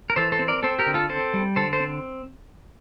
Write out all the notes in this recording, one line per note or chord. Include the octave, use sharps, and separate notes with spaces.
A#4
E3 A4 C5
A4 C5
C4
A#4 D5
C4 A4 C5
G4 A#4
D3
F4 A4
C4 A4 C5
G3
D3 A4 C5
A4 C5
C4